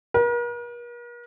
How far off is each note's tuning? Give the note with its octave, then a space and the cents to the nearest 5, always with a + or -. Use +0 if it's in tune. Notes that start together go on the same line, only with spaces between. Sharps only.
A#4 +45